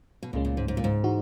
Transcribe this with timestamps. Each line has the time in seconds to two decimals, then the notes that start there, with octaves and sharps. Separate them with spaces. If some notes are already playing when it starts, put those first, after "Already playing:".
0.23 B2
0.33 C#2 A#2 C#3 G#3 C#4
0.45 A#2
0.57 G#2
0.68 G#2
0.77 A#2
0.84 G#2
1.04 E3 G#3 D#4 F#4